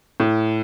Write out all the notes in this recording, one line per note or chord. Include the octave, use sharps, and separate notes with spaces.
A2